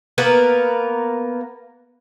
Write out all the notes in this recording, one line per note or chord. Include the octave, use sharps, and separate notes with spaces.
A#3 B3 A#4 B4